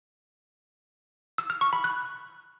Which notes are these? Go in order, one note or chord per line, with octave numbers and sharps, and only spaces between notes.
E6
F6
C#6
B5
F#6